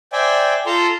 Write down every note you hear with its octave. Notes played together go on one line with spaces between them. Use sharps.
C5 D5 E5 G5 G#5
F4 A4 A5 A#5 C6